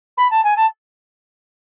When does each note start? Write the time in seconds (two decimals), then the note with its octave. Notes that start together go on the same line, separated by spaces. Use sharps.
0.17 B5
0.30 A5
0.43 G#5
0.56 A5